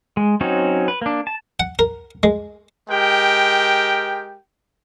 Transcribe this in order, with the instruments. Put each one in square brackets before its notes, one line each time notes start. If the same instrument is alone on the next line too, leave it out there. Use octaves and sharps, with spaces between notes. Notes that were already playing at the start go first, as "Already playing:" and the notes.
[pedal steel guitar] G#3
F#3 C4 C#4 D#4 F#4
B4
A#3 D4
A5
[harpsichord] F#5
A#4
G#3
[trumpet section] G#3 G4 A#4 G5